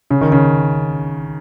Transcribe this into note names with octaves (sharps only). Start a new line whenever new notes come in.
C#3
D#3
C#3